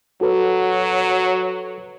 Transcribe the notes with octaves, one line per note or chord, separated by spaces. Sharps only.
F#3 F#4 A4 B4